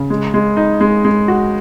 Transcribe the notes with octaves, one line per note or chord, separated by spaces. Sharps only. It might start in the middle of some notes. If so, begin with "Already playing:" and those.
Already playing: C#3
G#3
G#3
D#4
G#3
G#3
F#4